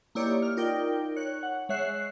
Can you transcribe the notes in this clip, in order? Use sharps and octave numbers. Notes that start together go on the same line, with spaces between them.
A#3 D#4 E4 G4 C#5 D5
F6
D#4 F4 A#4 D5 G5
C#5 F#6
F#5
G#3 C#5 E5 F#6 C7